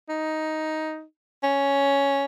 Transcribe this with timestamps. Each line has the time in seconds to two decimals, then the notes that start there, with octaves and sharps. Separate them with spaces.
0.09 D#4
1.44 C#4